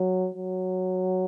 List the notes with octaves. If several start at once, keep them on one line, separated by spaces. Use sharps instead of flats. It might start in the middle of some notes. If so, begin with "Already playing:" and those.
Already playing: F#3
F#3